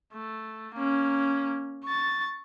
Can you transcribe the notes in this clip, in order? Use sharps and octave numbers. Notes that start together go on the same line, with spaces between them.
A3
A#3 C#4
C#6 A6